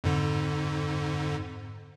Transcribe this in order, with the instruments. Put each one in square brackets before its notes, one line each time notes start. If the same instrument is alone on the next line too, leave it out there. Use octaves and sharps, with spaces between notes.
[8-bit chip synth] F2 G#2 D3